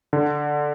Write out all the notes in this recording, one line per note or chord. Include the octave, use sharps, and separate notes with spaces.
D3